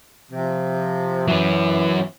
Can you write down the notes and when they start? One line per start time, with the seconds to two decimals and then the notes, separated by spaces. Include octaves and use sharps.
0.31 C3 F3
1.28 E3 F#3 C#4